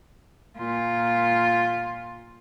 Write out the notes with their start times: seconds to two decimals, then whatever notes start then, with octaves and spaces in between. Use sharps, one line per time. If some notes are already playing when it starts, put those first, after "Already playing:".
0.57 A#2 F4